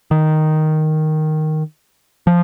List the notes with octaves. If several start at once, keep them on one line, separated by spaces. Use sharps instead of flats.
D#3
F3